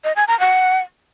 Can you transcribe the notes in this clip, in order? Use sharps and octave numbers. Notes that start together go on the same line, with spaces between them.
D#5
G#5
A#5
F#5